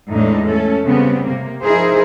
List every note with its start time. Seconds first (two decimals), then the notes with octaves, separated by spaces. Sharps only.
0.12 E2 A2 G#3 A3 D4 D#4
0.45 A3 C#4 A4
0.84 C#3 G3 B3 C4
1.26 C3 A#3
1.62 F3 D#4 E4 G#4 A#4 C5